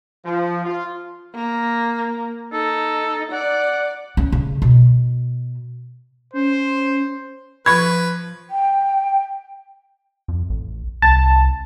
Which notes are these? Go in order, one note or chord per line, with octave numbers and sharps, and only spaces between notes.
F3
F4
A#3
D#4 A4
D5 F#5
C#4
C#3
B2
C#4 C5
F3 B4 B5 C#6 G#6
G5
F2
A1
C2 A5